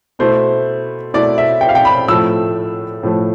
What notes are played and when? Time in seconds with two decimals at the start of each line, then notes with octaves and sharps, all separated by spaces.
0.19 B2 A3 E4 C5
1.14 B2 A3 E4 D5
1.38 E5
1.61 G5
1.69 F5
1.75 G5
1.85 B5
2.08 A2 F3 A3 E6
3.03 A2 F3 A3